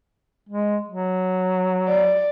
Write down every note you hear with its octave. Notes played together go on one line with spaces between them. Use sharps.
G#3
F#3
D5